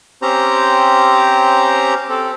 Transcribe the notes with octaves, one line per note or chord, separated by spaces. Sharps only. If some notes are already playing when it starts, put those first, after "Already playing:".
C4 C#4 G4 C5 A#5
C4 A4